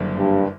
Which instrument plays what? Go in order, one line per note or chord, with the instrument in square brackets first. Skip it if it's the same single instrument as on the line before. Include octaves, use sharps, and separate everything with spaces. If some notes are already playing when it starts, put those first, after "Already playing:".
Already playing: [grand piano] F#1 F#2 D3 G3 A#3
[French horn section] G2